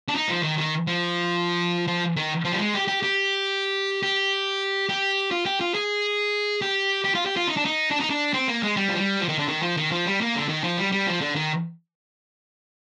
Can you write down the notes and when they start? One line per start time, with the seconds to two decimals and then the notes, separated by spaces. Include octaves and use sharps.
0.08 D4
0.15 D#4
0.29 F3
0.43 D#3
0.58 D#3
0.87 F3
1.88 F3
2.17 D#3
2.45 F3
2.52 G3
2.59 G#3
2.74 G4
2.88 G4
3.03 G4
4.03 G4
4.89 G4
5.31 F4
5.46 G4
5.61 F4
5.74 G#4
6.61 G4
7.04 G4
7.15 F4
7.26 G4
7.36 F4
7.48 D#4
7.57 D4
7.65 D#4
7.91 D4
8.00 D#4
8.10 D4
8.34 C4
8.48 A#3
8.63 G#3
8.77 G3
8.88 F3
8.98 G3
9.20 F3
9.29 D#3
9.39 D3
9.48 D#3
9.63 F3
9.77 D#3
9.92 F3
10.06 G3
10.21 A#3
10.35 D3
10.48 D#3
10.64 F3
10.78 G3
10.92 G3
11.07 F3
11.21 D3
11.36 D#3